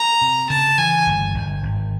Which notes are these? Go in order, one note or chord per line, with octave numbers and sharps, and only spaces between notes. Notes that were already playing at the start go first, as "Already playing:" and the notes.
Already playing: A#5
C3
C#3 A5
E3 G#5
G1
G1
G#1